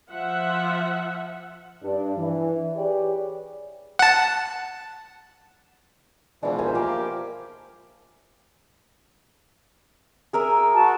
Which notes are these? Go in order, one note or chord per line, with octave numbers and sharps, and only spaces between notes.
F3 E5 F#5
G2 D4
E3
G4 G#4 B4 C#5 D5
F#5 A5
B2 E3 F3 G#3 D4
D#2 A#4 C5 E5 G#5
A#3 F4 G4 A#4 F5
G#4 A#4 E5
F#4 A5